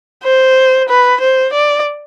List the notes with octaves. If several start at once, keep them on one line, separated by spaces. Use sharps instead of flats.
C5
B4
C5
D5